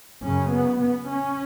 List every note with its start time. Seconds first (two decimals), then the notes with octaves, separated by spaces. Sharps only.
0.23 F#2 C#3 C#4
0.52 B3
0.80 B3
1.08 C#4